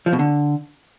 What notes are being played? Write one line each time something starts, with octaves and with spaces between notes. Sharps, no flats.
F3
B2
D3